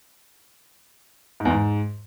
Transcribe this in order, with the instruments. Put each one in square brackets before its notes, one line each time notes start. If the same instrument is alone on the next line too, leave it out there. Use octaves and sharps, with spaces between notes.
[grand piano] G#2
E2
G#2